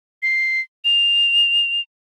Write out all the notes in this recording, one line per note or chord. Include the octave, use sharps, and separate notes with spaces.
C7
F7